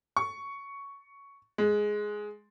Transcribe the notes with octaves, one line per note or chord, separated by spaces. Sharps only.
C#6
G#3